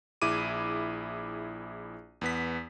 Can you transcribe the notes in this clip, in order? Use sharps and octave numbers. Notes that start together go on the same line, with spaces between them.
A#1 E4 G#4 D6 D#7
E2 B3 B6